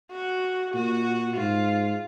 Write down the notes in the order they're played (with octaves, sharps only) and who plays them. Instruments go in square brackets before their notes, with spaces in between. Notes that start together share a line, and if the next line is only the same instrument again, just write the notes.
[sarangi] F#4
[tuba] A#2 [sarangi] F#4
[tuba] G#2 [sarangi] F4